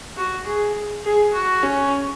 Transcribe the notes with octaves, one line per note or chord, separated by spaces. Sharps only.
F#4
G#4
G#4
F#4
C#4